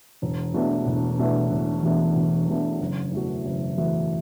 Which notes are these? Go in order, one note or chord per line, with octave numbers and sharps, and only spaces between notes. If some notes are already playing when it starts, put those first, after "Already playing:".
E1
E2 B2 A3 D4
E1
E2 B2 A3 D4
E1
E2 B2 A3 D4
E1
E2 B2 A3 D4
F#1
E2 E3 A3 F#4
F#1
E2 E3 A3 F#4